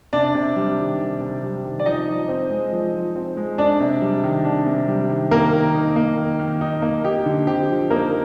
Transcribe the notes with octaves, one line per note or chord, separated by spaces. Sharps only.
C3 D4 D5
C3
G3
D#3
C3
C3
G3
D#3
D5
F3 D#4 D#5
F3
C4
G#3
F3
F3
C4
G#3
D4 D5
C3
G3
D#3
D4
C3
G3
D#3
D#3 A#3 A#4
D#3
D#4
A#3
D#3
D#3
D#4
A#3
D#4 G4
D3
C4 G4
F3
A#3 D#4 A#4